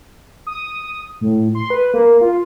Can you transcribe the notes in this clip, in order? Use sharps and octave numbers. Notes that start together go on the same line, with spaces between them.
D#6
A2
C6
B4
A#3
F4